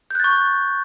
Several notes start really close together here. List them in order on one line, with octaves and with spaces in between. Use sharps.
G6 F#6 A6 C#6